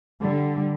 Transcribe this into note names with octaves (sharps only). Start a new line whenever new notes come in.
D3 G3